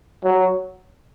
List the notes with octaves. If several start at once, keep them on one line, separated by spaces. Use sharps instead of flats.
F#3